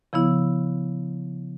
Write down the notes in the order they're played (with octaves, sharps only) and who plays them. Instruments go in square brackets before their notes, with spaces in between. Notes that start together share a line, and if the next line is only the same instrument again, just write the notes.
[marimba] C#3 F3 B3 E4